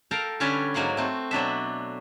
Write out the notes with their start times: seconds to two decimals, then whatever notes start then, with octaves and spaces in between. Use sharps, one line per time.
0.11 A4 A#4 F5 G5 A#5
0.40 D3 G3 C#4 B4 C#5 A5
0.74 G#2 F#3 A#3 F#5 C6
0.97 A3 C4 F#4
1.31 B2 F#3 D4 E5